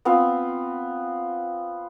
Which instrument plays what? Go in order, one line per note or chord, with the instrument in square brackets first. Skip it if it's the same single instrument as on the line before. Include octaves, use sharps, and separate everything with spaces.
[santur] B3 C4 F4